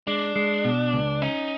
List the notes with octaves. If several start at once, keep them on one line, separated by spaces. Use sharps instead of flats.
G#3 D4
G#3
B2
C#2
C#4 D#4